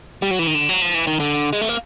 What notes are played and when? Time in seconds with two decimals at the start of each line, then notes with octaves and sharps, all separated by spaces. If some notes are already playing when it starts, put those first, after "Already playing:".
0.22 G3
0.31 F#3
0.39 E3
0.47 D#3
0.55 D3
0.69 F#3
0.82 F3
0.94 E3
1.07 D#3
1.20 D3
1.53 G#3
1.61 A3
1.69 A#3